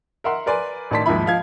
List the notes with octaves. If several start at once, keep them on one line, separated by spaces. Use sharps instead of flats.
A#4 E5 F#5 C6
A#4 B4 D5 G#5 C6
A1 D#3 D5 A5 C6 B6
D#2 G#2 D#3 F3 E4 B5
F3 F5 G#6